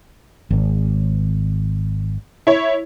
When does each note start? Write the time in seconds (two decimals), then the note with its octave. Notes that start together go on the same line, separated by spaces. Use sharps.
0.51 G#1
2.47 E4 C#5